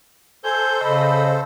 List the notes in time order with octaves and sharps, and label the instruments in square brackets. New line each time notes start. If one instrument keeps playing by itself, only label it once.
[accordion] A4 C5 [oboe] G#5 [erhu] G6
[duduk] C#3 [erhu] D#5 [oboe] B5